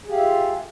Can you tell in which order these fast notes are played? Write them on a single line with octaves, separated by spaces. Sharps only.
G#4 G4 F5 E5 F4